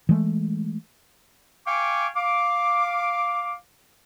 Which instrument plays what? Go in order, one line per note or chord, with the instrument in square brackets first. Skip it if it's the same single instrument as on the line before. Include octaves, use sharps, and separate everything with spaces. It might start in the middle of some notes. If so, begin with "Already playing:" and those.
[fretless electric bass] E3 G#3 A3
[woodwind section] F5 G5 G#5 C#6 D6
F5 D6